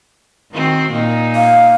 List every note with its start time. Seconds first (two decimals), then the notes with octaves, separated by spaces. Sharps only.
0.52 D#3 C4 F#4
0.90 A#2 A#3 D#4
1.35 F5